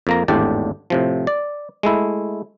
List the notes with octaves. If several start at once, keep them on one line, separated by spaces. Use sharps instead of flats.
F2 A#3 A#5
G#1 E2 A2 D4 G4 D5
A2 C3 F3
D5
G#3 A3 E4